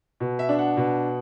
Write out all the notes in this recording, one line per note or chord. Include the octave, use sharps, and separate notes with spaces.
B2
E5
D4
F#5
B2